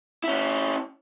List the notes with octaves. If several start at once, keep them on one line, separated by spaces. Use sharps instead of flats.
C#4 E4